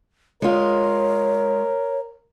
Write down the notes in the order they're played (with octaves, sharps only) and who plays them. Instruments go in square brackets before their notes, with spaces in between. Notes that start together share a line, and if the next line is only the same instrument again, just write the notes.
[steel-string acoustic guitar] G#3 F4 [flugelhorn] A#4 [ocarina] C#5